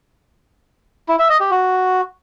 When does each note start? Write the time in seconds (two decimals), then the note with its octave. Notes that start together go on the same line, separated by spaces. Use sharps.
1.09 E4
1.19 E5
1.30 D#5
1.40 G4
1.51 F#4